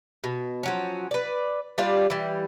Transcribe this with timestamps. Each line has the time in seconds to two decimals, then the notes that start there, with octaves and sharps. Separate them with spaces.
0.24 B2
0.63 F3 F#3 C#4
1.11 B4 D5
1.78 G3 D4 F4 D5
2.10 E3 G3